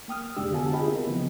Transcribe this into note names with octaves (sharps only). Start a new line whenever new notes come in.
A#3 G5 D#6 F6
F2 C3 G#3 D4 G4 E6
D3 B3 F#4 F5 G#5 A5
F4 G4 G#4 D#5 G5 B5
B3 C4 E4 A#4
C#3 E3 F3 A#3 B3